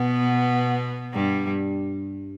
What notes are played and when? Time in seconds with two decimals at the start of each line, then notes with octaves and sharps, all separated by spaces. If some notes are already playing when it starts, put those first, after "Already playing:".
Already playing: B2 B3
1.14 G2 G3